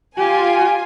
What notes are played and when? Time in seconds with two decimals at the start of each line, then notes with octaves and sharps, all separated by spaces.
0.17 F4 G4 G#5